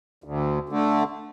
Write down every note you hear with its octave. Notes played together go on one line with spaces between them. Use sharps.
D2
D3 A3